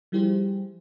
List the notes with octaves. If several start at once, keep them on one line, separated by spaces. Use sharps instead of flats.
F3 G3 E4 G4 G#4 C5